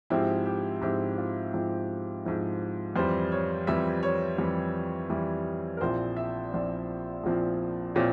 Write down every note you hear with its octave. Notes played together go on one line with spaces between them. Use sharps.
G#2 F3 C4 E4 G4
G4
G#2 F3 C4 E4 G4
F4
G#2 F3 C4 E4
G#2 F3 C4 E4
F2 E3 G3 C5
C#5
F2 E3 G3 E5
C#5
F2 E3 G3
F2 E3 G3
A#4
A#1 A#2 F3 C4 E4 C5
E5
A#1 A#2 F3 C4 E4
A#1 A#2 F3 C4 E4
A#2 F3 C4 E4 C#5